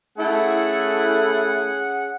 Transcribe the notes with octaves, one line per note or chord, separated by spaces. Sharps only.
A3 C#4 E4 G#4 F#5